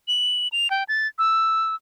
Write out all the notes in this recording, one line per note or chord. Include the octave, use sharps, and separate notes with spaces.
F#7
F7
G5
A6
E6